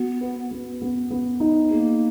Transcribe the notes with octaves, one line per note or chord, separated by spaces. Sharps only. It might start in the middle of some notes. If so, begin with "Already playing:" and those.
Already playing: B3 F#4
B4
B3
B3
B3
D#4
A#3 G#4